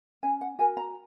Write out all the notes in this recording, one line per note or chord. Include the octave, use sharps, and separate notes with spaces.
C#4 G#5
F#5
F#4 A#4 G#5
A#5